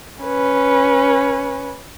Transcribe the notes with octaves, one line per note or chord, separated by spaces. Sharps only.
C#4 B4